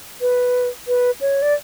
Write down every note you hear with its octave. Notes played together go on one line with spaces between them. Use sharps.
B4
B4
C#5
D5